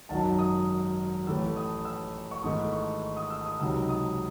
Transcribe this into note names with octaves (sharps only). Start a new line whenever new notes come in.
G#1 F#2 D#3 F#3 A5
D#6
A1 A2 E3 A3 E6
D#6
E6
C#6
G#1 G#2 E3 A3 D#6
C#6
C#6
D#6
E6
D#6
C#2 C3 D#3 F#3 E6
D#6